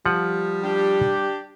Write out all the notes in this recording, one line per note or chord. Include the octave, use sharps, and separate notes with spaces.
F3 G3 F#5
D4 G4